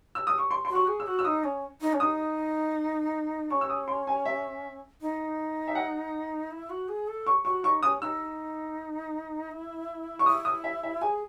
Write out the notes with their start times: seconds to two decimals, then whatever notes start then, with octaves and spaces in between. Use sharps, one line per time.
0.15 E6
0.27 D#6
0.38 C#6
0.51 C6
0.65 F#4 C6
0.75 C#6
0.87 G#4
1.00 E6
1.06 F#4
1.19 E6
1.25 D#4 D#6
1.44 C#4
1.81 D#4
1.93 C#4
2.00 D#4 D#6
3.50 C#4 C#6
3.61 E6
3.70 D#6
3.88 C6
4.07 G#5
4.25 E5
5.01 D#4
5.68 E5
5.75 F#5
6.51 E4
6.70 F#4
6.88 G#4
7.07 A4
7.27 C#6
7.45 F#4 C#6
7.64 D#4 C#6
7.83 C#4 D#6
8.01 D#4 E6
9.51 E4
10.19 C#6
10.26 E4 D#6
10.45 D#6
10.64 E5
10.83 E5
11.01 G#4 G#5